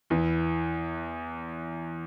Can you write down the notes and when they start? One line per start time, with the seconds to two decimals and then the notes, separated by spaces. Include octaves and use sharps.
0.10 E2 E3